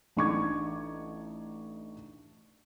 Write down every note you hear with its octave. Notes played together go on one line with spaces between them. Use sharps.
A1 D4 D#4 C#6 D6 G#6